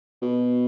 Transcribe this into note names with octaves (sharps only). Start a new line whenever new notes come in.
B2